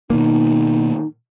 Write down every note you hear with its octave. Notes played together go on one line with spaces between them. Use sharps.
B2 D#3 A#3 D#4